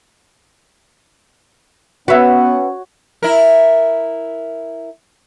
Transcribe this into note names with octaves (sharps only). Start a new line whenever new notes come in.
B3 C#4 F#4 B4 C#5 E5 F#5
E4 A#4